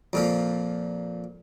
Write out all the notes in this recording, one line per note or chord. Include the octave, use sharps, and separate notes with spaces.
F2 A#2 F3